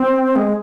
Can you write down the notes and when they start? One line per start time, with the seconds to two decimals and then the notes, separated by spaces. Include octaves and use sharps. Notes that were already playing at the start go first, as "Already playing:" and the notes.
Already playing: C4
0.36 G#3